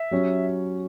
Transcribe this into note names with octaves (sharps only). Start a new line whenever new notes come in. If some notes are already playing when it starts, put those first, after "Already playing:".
Already playing: E5
F#3 C#4 G4 C#5